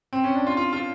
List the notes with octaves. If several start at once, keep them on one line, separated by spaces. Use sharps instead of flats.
C4
C#4
D4
F4
F4
F4